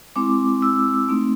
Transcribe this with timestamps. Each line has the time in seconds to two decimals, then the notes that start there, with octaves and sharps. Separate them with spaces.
0.16 G#3 C4 E4 D6
0.62 E6
1.09 A3 C4 D#4